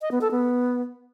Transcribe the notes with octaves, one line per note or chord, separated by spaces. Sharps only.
D#5
B3
A4
B3